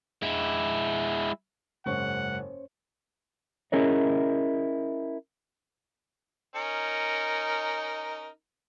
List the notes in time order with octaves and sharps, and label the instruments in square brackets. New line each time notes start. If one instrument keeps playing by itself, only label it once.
[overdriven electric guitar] G#3 E4
[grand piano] F#1 G#2 C#6 [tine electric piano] C#4 C5 C#5 [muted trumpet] F#5
[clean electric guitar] C#4 E4 G#4 A#4 C#5 D#5
[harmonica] C#4 D#4 A#4